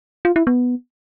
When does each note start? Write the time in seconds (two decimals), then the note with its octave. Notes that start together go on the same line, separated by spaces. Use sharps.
0.25 F4
0.36 E4
0.47 B3